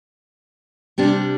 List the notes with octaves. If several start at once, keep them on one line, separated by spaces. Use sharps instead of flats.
C3 G3 D4 G4